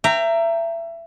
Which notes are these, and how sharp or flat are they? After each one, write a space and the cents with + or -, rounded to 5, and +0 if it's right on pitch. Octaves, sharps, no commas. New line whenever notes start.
E5 +25 G5 +0 A#5 -15